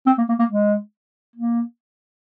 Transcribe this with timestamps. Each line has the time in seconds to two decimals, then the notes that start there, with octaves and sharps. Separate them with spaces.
0.06 C4
0.18 A#3
0.29 A#3
0.39 A#3
0.50 G#3
1.36 A#3